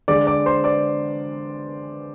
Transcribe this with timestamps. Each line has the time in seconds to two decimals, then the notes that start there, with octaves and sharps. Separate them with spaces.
0.08 D3 G#3 D5 D6
0.27 D5 D6
0.46 C5 C6
0.64 D5 D6